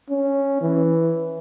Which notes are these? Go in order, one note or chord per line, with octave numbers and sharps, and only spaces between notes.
C#4
E3